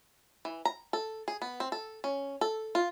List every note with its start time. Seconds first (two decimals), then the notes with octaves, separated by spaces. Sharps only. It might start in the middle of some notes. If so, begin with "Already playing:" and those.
0.45 E3
0.65 A#5
0.93 A4
1.28 G#4
1.42 B3
1.60 C4
1.72 A4
2.04 C#4
2.41 A4
2.75 F4